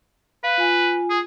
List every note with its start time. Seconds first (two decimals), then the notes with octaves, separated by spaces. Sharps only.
0.44 B4 F5
0.58 F4 G#5
1.10 G#4